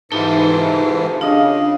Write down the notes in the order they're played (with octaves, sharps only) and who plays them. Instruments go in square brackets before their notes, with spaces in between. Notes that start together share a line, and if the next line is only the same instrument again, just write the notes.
[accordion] G#2 E3 [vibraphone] D#4 [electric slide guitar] F4 G4 A4
[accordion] C#3 [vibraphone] D4 [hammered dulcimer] D#5 F5